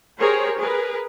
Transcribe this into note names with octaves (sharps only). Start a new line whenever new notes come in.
G4 G#4 A#4 C5 C#5
G#4 A#4 B4